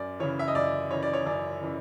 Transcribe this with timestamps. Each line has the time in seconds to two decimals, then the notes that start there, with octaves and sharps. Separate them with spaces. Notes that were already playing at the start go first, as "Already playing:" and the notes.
Already playing: F#2 D5
0.20 C#3 E3 C#5
0.39 E5
0.48 D#5
0.55 F#2 D5
0.91 C#3 E3 C#5
1.03 D5
1.13 C#5
1.26 F#2 D5
1.61 C#3 E3